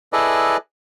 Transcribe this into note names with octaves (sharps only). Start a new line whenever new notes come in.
E4 G#4 A4 B4 D5 D#5